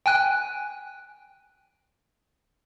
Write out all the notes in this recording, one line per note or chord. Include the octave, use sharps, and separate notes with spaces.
G5 G#5 F#6